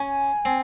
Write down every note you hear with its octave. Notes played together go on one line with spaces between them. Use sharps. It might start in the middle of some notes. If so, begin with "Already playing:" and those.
Already playing: C#4 G#5
C4